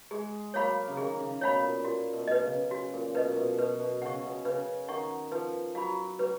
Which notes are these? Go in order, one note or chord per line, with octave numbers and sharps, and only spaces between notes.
G#3 G#4
F#3 A#3 C#5 F5 B5
C#3
D#3 G#4
C#3
B2 C#5 F5 B5
A#2
A#2 F#4
B2
B4 D#5
C#3
F#4
A#2
B2 B4 D#5
A#2
B2
B2 B4
B2
C#3 F#5 C#6
B2
C#3 B4
D#3 F#5 C#6
F3 B4
F#3 F5 B5
F#3 B4